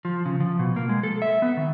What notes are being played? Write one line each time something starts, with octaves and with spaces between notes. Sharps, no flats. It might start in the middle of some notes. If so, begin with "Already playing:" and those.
F3
C#3
F3
B2
A#3
G#3
A4
E5
B3
D#3